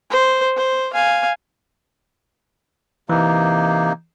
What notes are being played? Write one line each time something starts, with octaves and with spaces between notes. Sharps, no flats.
C5
C5
F5 G#5
C3 E3 A#3 D#4